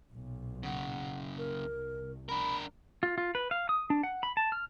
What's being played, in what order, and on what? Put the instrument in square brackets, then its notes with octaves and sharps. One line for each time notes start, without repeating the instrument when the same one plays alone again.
[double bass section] B1 A#2
[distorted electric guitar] F#2 C#3 [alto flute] F#5
[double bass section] C2 [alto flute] A#4
[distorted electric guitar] D4 A#4 [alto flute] B5
[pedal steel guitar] F4
F4
B4
F5
D#6
D4
F#5
B5
A5
F6